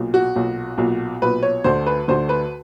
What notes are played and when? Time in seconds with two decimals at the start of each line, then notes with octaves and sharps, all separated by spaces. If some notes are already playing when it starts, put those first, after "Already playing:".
Already playing: B1 A#2
0.14 F#4
0.36 B1 A#2
0.78 B1 A#2
1.22 B1 A#2 B4
1.43 C#5
1.64 D2 D3 C5
1.86 B4
2.08 D2 D3 C5
2.29 B4